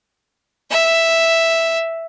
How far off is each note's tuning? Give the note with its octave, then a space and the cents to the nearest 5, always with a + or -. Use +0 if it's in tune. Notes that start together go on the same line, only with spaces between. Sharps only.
E5 +0